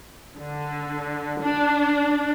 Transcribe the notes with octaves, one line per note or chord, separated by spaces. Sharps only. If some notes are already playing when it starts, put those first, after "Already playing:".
D3
D4